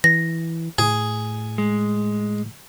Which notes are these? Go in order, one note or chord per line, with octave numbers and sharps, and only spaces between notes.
E3 A#6
A2 G#4
G#3